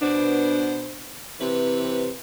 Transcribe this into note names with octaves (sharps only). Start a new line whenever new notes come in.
B2 B3 D4 C5
C3 E3 C4 B4